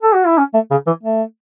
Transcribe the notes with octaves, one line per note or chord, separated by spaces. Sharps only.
A4
F#4
E4
C#4
A3
C#3
E3
A3